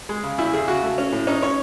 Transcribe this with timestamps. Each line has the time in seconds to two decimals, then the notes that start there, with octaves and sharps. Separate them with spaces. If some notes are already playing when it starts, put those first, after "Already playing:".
0.09 G#3
0.23 C#3
0.38 E2 E4
0.53 E2 G#4
0.68 C#3 F#4
0.83 A3
0.98 C#4
1.12 A2
1.27 C#4 D#4
1.42 C#4 C#5